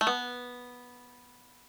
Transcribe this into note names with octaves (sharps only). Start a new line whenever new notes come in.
A3
B3